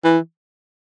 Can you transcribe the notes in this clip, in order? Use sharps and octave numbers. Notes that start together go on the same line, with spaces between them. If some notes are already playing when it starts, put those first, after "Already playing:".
E3